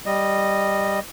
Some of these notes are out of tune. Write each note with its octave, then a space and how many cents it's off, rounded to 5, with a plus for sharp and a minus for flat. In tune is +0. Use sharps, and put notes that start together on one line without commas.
G3 +0 D#5 -10